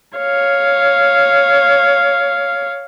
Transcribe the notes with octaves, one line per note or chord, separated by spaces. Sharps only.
C#5 F5